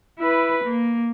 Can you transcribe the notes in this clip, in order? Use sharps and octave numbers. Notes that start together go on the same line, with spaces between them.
E4 B4
A#3